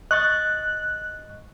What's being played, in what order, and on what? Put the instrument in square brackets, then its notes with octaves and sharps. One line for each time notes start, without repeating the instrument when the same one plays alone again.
[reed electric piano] D#5 C#6 A6 [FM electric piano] F#6